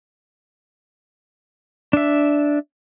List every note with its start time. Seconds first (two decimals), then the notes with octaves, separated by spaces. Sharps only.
1.93 D4 E5